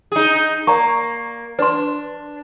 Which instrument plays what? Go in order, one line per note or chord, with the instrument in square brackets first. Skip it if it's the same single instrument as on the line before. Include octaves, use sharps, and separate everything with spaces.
[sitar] D#4 G#4
[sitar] A#3 [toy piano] D5 A#5 C#6
[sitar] D4 [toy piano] B4 C6